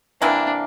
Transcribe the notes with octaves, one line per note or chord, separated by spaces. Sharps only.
C3 E3 A#3 D4